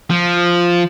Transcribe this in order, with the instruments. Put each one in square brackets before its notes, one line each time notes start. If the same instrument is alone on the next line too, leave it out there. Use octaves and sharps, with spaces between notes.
[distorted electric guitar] F3